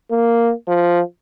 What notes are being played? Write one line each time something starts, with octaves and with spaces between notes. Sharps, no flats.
A#3
F3